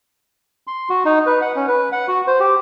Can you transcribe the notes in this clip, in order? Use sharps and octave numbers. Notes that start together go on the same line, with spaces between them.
C6
F#4
D#4
B4
F#5
C#4
B4
F#5
F#4
C5
G4